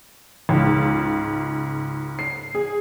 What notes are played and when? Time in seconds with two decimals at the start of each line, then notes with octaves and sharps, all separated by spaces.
0.49 C#2 G#2
2.19 C7
2.55 G#4